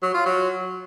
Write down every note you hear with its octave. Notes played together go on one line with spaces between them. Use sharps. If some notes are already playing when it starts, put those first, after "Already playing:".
F#3
F4
F#3